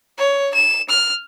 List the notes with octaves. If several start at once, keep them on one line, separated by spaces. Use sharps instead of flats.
C#5
E7
F6